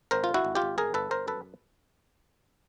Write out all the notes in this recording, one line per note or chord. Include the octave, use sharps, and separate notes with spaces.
G#1 A#4 C5
F4
D3
E4 F#4
G#1
F4 G4
G#1
G1 G#4 A#4
G1 A4 B4
G1 A#4 C5
F#2 A4 B4